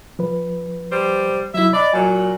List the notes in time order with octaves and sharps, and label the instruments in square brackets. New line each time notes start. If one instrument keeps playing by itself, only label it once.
[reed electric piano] F3 B4
[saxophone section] G3 C5
[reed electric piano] F#3 E4 [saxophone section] E5
[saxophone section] D5 [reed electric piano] D#5 B5
[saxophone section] A#2 F#3 [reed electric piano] G#5